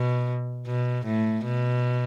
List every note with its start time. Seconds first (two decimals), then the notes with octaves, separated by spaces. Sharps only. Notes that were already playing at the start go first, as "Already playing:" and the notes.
Already playing: B2
0.67 B2
1.05 A2
1.44 B2